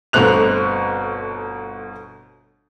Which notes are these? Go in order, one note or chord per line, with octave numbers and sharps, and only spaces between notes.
G1 B2 A3 C4 F#6 F7